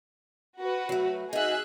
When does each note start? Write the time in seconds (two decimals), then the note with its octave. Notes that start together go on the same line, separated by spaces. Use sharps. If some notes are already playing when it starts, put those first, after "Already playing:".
0.58 F#4 B4
0.89 F#3 A3
1.33 D#4 F#4 G#4 E5 F#6